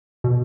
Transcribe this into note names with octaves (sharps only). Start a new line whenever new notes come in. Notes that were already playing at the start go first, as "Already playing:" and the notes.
B2